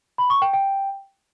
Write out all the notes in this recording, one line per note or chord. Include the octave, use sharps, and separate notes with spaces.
B5
C#6
G5
G5